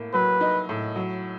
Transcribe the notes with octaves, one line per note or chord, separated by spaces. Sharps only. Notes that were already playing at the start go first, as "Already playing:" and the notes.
Already playing: A2 A#3
F#3 B4
D#4
A2
F#3